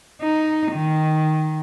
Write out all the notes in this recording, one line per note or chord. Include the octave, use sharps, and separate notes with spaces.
D#4
D#3